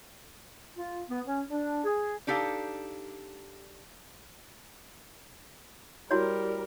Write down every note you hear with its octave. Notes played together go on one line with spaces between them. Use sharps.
F4
B3
C#4
D4
G#4
D4 D#4 G4 A4 F5
G3 E4 F#4 A#4 C#5